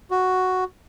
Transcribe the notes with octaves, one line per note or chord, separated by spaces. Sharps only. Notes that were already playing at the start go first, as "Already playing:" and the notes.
F#4